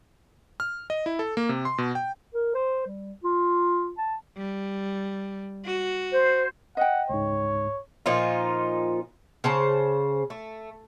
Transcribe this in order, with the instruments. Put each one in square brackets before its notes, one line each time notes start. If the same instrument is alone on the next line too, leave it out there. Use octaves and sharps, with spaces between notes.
[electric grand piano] F6
D#5
E4
A4
A#3
C3
C6
B2
G5
[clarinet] A#4
C5
G3
F4
A5
[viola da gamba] G3
F#4
[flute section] C5
[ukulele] D#5 G5 [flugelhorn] F#5
[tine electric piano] C#2 G#2 [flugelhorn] C#5
[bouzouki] A#2 F3 D#4 F4
C#3 C5 A5
A3